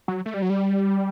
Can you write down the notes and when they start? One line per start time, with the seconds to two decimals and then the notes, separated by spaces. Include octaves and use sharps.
0.08 F#3
0.26 A3
0.34 G3
0.42 F#3
0.50 G3